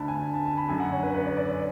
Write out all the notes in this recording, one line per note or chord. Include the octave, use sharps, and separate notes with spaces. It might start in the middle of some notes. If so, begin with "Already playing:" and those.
Already playing: D2 D3 A5 B5
G#5
A5
A5
B5
F#2 D3 G#5
F#5
C#5
B4
B4
D5
D5
D5